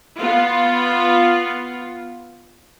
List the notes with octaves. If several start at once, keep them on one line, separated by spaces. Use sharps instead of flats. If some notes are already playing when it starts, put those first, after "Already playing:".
B3 F4